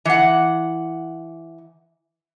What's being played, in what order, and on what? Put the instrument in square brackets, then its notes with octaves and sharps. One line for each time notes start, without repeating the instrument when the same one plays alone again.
[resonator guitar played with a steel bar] E3 F#5